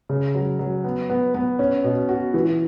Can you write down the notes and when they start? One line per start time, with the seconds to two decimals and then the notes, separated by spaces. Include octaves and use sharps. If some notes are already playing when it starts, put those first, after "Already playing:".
0.09 C#3
0.35 F#3
0.59 F#3
0.84 B3
1.10 B3
1.35 B3
1.59 C#4
1.84 B2
2.09 F#4
2.34 E3